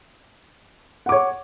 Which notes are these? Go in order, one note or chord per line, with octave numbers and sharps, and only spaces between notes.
C#5 F#5 D6